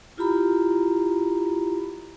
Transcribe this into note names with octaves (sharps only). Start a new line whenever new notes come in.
E4 F4 G4 A#5 B5